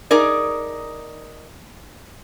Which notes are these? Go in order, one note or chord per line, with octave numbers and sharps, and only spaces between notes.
D#4 G#4 A#4 D5